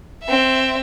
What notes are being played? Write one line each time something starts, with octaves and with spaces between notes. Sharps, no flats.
C4 E5